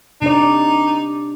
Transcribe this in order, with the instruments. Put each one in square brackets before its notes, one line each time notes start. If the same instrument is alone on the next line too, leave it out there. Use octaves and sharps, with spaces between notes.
[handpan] C3 D4 D5 [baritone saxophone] D#4